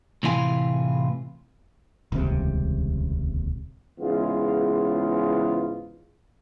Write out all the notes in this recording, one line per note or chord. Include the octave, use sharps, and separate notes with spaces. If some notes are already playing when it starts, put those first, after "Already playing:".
A2 C3 E3 F4 G#5
D#1 C#2 C3
G#2 C#3 E3 G#3 B3 F4